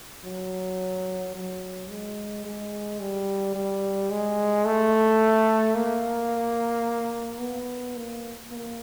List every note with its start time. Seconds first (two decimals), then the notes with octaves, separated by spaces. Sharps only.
0.24 F#3
1.35 F#3
1.89 G#3
2.45 G#3
3.00 G3
3.55 G3
4.11 G#3
4.65 A3
5.75 A#3
7.41 B3
7.96 A#3
8.51 A#3